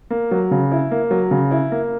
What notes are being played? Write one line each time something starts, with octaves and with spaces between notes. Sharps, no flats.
A#3
F#3
C#3
E4
A#3
F#3
C#3
E4
A#3